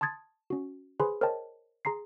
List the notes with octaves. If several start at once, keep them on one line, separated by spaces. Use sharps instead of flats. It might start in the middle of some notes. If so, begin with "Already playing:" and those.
A5 C6 D#6 G#6 A6
C#4 F#4
G#4 B4 C5 G#5 B5 C6
A#4 C5 C#5 D#5 G5 A5
G#4 A#5 C6 C7